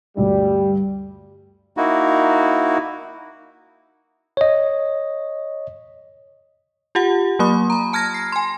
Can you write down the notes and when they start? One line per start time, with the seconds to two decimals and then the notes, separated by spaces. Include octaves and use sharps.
0.17 D2 G2 G3
1.77 A#3 D#4 E4 F#4
4.37 C#5 D#5
6.95 F4 G4 F#5
7.39 F#3 A#3 B5 D#6
7.70 A#5 B5
7.93 A5 F6 G#6 A#6
8.14 C7
8.32 G#5 C6